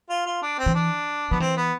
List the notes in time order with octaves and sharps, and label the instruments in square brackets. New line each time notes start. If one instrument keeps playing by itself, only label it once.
[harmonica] F4
F4
D4
C4
[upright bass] E3
[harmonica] D4
[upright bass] F3 [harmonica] B3
[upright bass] E3 [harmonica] C4
[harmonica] B3